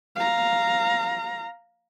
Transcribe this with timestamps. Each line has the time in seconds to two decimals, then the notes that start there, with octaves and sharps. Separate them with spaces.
0.16 F5 A#5